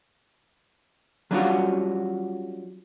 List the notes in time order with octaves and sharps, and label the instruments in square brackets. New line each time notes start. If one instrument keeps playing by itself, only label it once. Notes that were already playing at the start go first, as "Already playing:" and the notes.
[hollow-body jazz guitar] F#3 G3 C#4 D4 F4 F#4